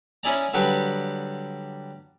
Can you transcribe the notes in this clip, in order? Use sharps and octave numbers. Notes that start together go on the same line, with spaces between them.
C#4 E4 G#4 D5 A#5
D3 F#3 G3 G4 B4